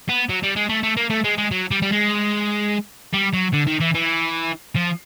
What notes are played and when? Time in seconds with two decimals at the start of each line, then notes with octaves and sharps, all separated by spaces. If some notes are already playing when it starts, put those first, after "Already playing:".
0.09 B3
0.29 F#3
0.43 G3
0.56 G#3
0.69 A3
0.83 A3
0.97 A#3
1.10 A3
1.24 G#3
1.38 G#3
1.51 F#3
1.71 G3
1.82 G3
1.92 G#3
3.13 G3
3.33 F#3
3.53 D3
3.67 D#3
3.81 E3
3.95 E3
4.75 F3